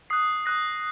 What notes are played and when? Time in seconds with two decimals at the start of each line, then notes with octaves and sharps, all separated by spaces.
0.10 D#6 F#6 C7
0.46 D#6 F#6 A#6